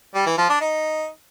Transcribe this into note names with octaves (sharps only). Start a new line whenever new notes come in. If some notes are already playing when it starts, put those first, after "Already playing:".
G3
E3
F3
D4
D#4